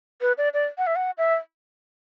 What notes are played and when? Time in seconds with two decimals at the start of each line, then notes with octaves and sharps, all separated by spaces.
0.21 B4
0.38 D5
0.54 D5
0.78 F#5
0.87 E5
0.96 F#5
1.18 E5